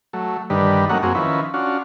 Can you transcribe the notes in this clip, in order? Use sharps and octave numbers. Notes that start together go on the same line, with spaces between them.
F#3 A3
G2 D3 D#3 G3 B4
F#3 A3 A#3 C#4 D#4 F#5
F#2 A#3 C4 F#4 G#4
D#3 F3 C#4 E4 B4
C#4 D4 F4 F#4